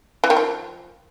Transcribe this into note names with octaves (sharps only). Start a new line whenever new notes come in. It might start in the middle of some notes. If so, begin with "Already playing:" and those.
E3
D#3
F3